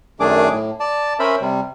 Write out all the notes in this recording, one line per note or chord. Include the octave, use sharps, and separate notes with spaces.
F#2 D#3 A3 D4 G#4 D6
A2
D5 A5
C#4 A#4 C5 E5 B5
C3 G3